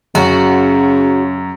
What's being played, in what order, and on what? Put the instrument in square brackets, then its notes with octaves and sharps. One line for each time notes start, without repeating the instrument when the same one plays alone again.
[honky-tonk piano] F#2 [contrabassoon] C#3 [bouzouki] F#4